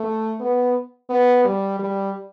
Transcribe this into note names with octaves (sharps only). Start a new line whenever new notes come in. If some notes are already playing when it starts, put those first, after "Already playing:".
Already playing: A3
B3
B3
G3
G3